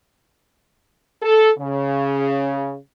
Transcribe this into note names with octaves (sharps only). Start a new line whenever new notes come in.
A4
C#3